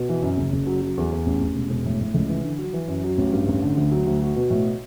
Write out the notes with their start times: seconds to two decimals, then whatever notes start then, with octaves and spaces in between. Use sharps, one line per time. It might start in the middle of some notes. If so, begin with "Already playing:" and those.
Already playing: B2
0.09 E3
0.23 F#2
0.37 F#1
0.52 F#1
0.67 F#3
0.81 F#3
0.97 E2
1.12 E2
1.26 A1
1.40 A1
1.55 E1
1.70 E1
1.85 A2
2.01 A2
2.14 C#2
2.29 E3
2.44 D3
2.59 F#3
2.73 E3
2.88 F#2
3.04 F#3
3.18 A1
3.32 G2
3.48 A1
3.62 D3
3.77 D2
3.91 F#3
4.06 D2
4.21 F#4
4.36 B2
4.50 A2